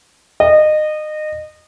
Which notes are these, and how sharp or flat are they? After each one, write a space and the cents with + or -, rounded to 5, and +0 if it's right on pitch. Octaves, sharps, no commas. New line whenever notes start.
D#5 -25